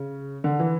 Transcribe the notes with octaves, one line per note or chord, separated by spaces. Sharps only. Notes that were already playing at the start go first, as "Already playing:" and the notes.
Already playing: C#3
D3
E3